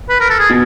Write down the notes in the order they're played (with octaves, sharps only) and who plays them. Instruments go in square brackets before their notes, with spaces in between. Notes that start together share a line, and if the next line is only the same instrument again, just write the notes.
[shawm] B4
A#4
A4
G#4
[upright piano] B2